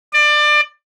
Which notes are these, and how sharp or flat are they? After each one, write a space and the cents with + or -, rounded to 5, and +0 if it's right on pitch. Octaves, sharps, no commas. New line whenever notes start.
D5 +25